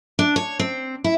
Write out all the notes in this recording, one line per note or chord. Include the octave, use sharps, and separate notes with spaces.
D4
C#5
C4
E4